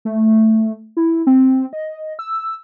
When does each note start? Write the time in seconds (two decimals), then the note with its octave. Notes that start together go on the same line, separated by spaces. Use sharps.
0.05 A3
0.97 E4
1.27 C4
1.73 D#5
2.19 E6